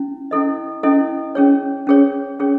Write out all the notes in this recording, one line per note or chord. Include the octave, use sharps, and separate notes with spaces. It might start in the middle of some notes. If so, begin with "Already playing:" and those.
Already playing: C#4 E4
C#4 E4 A4 D#5
C#4 E4 A4 D#5
C#4 G#4 C#5
C#4 G#4 C#5
C#4 G#4 C#5